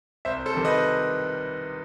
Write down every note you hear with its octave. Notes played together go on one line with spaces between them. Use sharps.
C2 C5 E5
A4 C5
C3 D#3 G3
B4 D#5